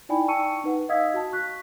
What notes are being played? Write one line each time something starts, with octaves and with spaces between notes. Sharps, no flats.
D#4 E4 D5 G5 G#5 B5
G5 A5 C#6 E6 C#7 D#7
D#4 B4 F#5
D#5 F5 D#6 E6 G#6 B6
F#4 A5
C#6 F#6 B6